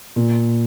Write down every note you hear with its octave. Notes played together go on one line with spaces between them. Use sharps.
A#2